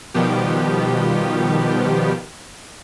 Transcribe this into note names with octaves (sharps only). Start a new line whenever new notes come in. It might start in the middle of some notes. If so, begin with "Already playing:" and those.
B2 D#3 F3 G3 B3 G4